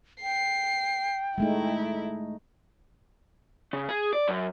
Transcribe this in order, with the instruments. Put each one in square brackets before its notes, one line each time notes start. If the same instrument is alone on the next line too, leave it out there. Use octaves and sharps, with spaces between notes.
[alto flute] G5 [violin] C7
[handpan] G#3 A3 D#4 [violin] E4
[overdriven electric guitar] C#3
G#4
D5
F#2